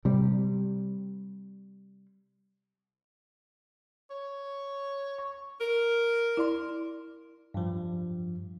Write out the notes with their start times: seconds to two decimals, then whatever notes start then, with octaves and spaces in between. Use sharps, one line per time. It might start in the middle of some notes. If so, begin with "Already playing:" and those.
0.05 C3 G3
4.10 C#5
5.19 C#6
5.61 A#4
6.37 E4 D5 C6
7.54 G2 F3